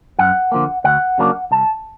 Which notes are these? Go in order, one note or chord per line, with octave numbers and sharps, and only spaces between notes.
F#2 F#5
D3 F3 A#3
D2 F#5
C#3 F#3 A#3 D4
C2 A5